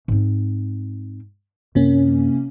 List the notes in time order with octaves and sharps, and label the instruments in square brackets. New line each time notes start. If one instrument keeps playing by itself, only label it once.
[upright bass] G#2 C4
[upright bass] F#2 [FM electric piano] C3 A#3 C#4